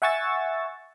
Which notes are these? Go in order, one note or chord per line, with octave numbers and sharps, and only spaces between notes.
E5 F#5 G#5 C#6 E6 A6